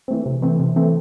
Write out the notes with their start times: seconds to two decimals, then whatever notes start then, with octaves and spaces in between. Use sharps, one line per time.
0.08 E3 A3 C4
0.26 C3
0.42 E3 A3 C4
0.60 C3
0.76 E3 A3 C4